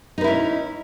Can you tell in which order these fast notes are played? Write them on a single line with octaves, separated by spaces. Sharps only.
D#4 B4 E4 C#4